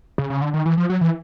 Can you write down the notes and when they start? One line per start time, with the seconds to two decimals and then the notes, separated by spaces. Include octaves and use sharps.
0.18 C#3
0.30 C#3
0.42 D3
0.54 D#3
0.66 E3
0.77 F3
0.90 F#3
1.01 E3